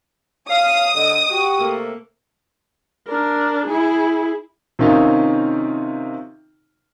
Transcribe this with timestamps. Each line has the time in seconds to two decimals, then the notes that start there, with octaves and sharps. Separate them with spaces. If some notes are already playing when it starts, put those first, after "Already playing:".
0.49 C#5 F5 D#6
0.95 D3 D#5
1.30 F#4 G4 G5 C#6
1.59 C3 A3 A#3
3.08 D4 A#4
3.66 E4 G#4
4.79 C3 D#3 C4 C#4 D#4 F4